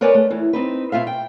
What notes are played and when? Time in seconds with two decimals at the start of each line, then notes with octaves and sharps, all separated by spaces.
0.01 A#4 B4 C#5 D5 G#5
0.15 A3
0.30 E2 E3
0.53 C4 D#4 B4
0.92 B2 F4 E5 F5
1.07 G5